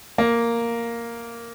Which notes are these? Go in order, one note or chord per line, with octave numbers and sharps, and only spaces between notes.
A#3